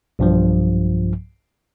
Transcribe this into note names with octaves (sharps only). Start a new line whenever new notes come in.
B1 G2 F3